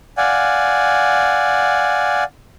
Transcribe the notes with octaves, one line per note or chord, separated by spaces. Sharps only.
D5 F5 F#5 G#5